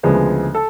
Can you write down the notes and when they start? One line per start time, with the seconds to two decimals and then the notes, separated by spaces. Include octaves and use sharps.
0.03 D2 C#3 F3 G#3 B3
0.55 A4